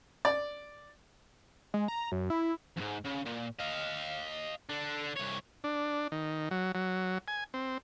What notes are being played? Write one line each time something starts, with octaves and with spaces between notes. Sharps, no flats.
D5
G#3
A#5
F#2
E4
F2 G#2
C#3
A#2
D#5 F5
D3 D4
C2 C#5
D4
D#3
F#3
F#3
G#5
C4